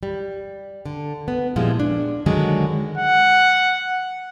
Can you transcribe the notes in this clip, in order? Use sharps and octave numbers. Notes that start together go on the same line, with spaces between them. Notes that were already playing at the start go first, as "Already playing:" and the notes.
G3
D3
B3
A#2 F3 G3 G#3 E4
D4
D3 D#3 F#3 G#3
F#5